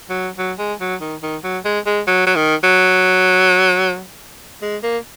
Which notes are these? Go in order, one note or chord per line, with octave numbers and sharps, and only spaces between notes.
F#3
F#3
G#3
F#3
D#3
D#3
F#3
G#3
G#3
F#3
F#3
D#3
F#3
G#3
A#3